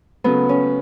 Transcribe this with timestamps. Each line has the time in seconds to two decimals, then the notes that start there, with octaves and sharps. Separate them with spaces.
0.24 C#3 F#3 A3 B3
0.49 C#4